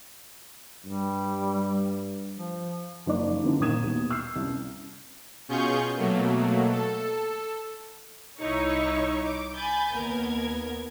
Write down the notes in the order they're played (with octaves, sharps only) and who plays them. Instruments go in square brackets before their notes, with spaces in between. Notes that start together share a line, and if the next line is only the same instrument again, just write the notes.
[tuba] G2 [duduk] G3
[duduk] F3
[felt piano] F#1 F3 D#4 D5 D6
F#2 D3 E3 G3 C4 D#4
A#1 A#2 D#3 D#6 G#6 E7
D#2 B2
E6 F6 G6 C7
C2 F#2
[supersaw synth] B2 C#4 F4 G#4 C#6 G6
B2 F#3 A3 A#3
A4
[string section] C2 D#4 E4 C#5 C#6
D6
G#5 B5 G6 A6
D#2 B3 A#4 G#6